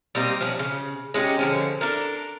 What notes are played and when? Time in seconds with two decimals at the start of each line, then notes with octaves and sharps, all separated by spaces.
0.15 G3 A#3 C4 D#4
0.41 F3 C#4 D4
0.59 C#3
1.14 G#3 C#4 D#4 G4
1.39 D3 F3 C#4
1.81 D4 A4 A#4